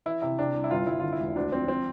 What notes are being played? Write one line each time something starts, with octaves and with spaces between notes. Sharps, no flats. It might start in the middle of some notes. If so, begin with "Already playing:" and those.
E3 E4
C3 E4
C3 D4
C2
E4
G1 F4
G1 E4
D3 F4
E4
E1
D2 D4
F3 C4
F3 C4